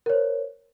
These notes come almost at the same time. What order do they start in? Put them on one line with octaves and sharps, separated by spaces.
A#4 C#5 C5